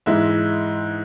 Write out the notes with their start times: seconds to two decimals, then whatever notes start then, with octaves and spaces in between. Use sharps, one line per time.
0.06 G#2 E3 G#3 E5